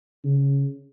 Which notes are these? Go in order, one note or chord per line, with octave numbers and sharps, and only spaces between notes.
C#3